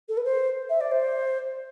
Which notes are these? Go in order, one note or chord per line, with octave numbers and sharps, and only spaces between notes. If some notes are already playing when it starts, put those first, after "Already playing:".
A4
B4
C5
E5
D5
C5